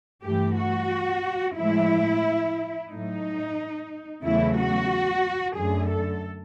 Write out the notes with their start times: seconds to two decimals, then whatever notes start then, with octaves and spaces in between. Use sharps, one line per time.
0.24 G2 E3 A3 G4
0.58 F#4
1.57 A2 F3 G#3 E4
2.90 A2 F#3 A3 D#4
4.24 E2 C#3 F#3 A3 E4
4.58 F#4
5.57 F#2 D3 F#3 A3 G#4
5.91 A4